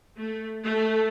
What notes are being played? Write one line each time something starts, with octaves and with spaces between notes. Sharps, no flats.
A3
A3